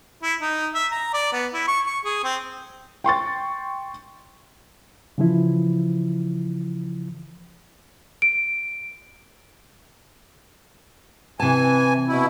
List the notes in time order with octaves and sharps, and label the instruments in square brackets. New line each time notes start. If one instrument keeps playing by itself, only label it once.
[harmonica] E4
D#4
E5
A#5
D5
B3
E4
C#6
C#6
G#4
C4
[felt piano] G5 C6 C#6 A6
[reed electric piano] C#3 E3 F3 E4
[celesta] D7
[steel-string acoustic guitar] C3 A5 [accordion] E3 G#5
[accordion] B2 E4